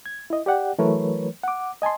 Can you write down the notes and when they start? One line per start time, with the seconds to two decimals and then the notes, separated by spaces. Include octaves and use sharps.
0.06 G#6
0.30 E4 D#5
0.46 G4 D5 F#5 G5
0.79 E3 F#3 A3 A#4 B4 C#5
1.43 F#5 D6
1.82 D#5 G#5 A5 C6